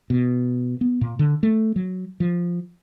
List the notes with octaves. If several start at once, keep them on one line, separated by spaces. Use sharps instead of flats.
B2
B3
A#2
D3
A3
F#3
F3